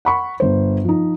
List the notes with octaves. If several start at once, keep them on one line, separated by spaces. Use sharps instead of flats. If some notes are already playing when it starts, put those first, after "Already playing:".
F#5 B5 C#6
G1 C5
F3 D#4